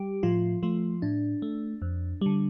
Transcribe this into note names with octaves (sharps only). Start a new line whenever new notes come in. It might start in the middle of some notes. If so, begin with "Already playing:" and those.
Already playing: G3 G4
A2 F3 F4
F3 A3 F4
A2 D4
A3
F2
D3 G3